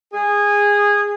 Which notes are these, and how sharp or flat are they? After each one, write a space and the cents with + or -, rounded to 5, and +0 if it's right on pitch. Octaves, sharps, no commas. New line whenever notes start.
G#4 -15